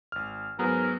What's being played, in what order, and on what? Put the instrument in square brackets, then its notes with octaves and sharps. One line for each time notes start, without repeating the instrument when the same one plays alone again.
[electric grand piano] G#1 F6
[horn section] G#2 A#4 [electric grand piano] F#3 B3 G#4